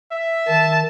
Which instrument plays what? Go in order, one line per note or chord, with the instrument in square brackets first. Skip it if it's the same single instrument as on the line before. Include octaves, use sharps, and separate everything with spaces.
[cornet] E5
[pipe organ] D#3 [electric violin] A5